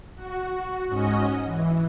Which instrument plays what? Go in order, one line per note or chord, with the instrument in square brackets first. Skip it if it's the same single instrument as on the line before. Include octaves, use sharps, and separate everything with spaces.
[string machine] F#4
G#2 C#4 F#4 D#5
E3